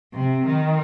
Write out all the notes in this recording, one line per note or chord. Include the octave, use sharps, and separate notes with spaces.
C3
D#3